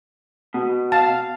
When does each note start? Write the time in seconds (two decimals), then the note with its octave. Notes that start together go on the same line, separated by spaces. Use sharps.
0.54 B2
0.92 F5 A5